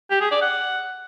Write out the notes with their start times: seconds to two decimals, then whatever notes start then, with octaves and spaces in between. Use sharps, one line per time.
0.11 G4
0.21 G#4
0.31 D5
0.42 F#5